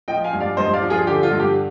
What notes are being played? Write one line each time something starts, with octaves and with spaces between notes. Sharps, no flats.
F3 D#5 G5
F5 G#5
G2
D5 F5
G2 C5 D#5
D5 F5
F3
F4 G#4
D3 G4
F4
G2
G4